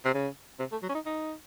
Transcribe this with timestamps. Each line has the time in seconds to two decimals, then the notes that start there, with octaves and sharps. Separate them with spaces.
0.05 C3
0.14 C#3
0.60 C3
0.72 A3
0.83 F#3
0.89 C#4
0.95 D#4
1.06 D#4